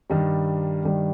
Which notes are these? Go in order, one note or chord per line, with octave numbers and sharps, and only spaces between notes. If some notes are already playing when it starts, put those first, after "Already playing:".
G2 D#3 G3
G2 D#3 G3